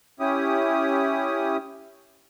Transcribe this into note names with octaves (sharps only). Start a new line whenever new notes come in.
C#4 E4 G4 D#6